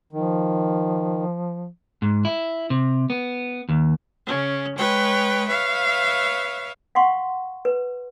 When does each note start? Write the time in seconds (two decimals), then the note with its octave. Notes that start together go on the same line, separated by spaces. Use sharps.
0.13 D#3 F3
2.02 G#2
2.25 E4
2.70 C3
3.10 B3
3.69 D#2
4.25 C#3 C#4
4.75 G#3 B4 C#5 G5
5.47 B4 C#5 E5 F5
6.95 F5 F#5 C6 C#6
7.65 B4